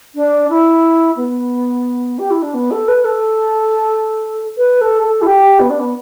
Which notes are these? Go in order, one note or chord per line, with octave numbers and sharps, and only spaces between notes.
D4
E4
B3
G4
E4
D4
B3
A4
B4
A4
B4
A4
A4
E4
G4
B3
D4
B3